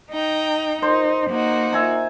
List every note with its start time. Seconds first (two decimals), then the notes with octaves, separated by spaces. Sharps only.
0.11 D#4 G5 A#5
0.82 D#4 C5
1.30 A#3 D#4 F#4
1.73 E5 G#5 A#5